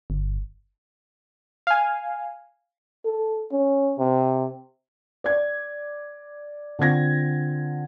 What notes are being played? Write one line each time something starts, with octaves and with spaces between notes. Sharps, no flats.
G1
F5 G#5
A4
C#4
C3
D5 G#6
D3 C4 F4 G#6 A#6